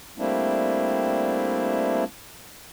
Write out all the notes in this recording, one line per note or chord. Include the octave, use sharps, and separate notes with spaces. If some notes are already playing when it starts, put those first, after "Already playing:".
G3 A3 A#3 C4 D4 E4